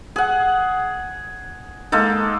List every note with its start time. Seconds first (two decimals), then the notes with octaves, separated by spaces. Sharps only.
0.16 G#4 F#5
1.92 G#3 A#3 D#4 A4